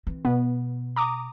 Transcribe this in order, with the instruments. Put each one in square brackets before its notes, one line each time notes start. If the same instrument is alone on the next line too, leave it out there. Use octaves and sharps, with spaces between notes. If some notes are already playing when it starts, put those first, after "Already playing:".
[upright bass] E3 C4
[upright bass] B2 [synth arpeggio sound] B3
[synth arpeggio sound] A#5 D6 D#6